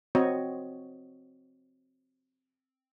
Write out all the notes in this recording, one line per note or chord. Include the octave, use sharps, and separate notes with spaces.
C4 F#4 C#5 D#5